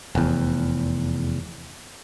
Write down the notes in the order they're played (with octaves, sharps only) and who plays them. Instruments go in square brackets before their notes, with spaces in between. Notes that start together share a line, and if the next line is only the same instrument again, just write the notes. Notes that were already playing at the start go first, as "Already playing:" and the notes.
[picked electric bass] F1 E2